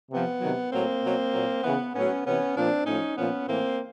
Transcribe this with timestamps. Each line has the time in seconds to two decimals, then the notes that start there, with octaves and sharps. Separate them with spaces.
0.11 C3 F3 B3
0.41 C3 D#3 F#3
0.72 A2 F#3 A#3 C4
1.03 B2 F#3
1.33 A#2 F#3
1.63 C#3 E3 B3
1.94 A2 F#3 B3 C#4
2.25 C3 E3 B3 C#4
2.55 A#2 F3 C4 D4
2.86 A2 F3 C#4 D#4
3.16 A#2 F3 B3 C#4
3.47 A2 E3 A#3 C4